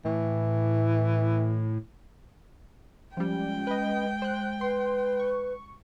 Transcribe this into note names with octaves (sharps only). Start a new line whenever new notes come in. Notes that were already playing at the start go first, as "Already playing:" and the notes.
A2 E3
F3 G3 G#3 C#4 G5
B4 D#5
C5 F#6
B4 C6
C#6